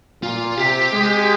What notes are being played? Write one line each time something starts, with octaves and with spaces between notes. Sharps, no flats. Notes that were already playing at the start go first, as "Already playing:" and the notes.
A#2 F4
C3 G4
G#3